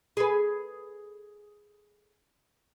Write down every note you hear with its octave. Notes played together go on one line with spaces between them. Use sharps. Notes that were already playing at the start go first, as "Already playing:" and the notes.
G#4 A4 B4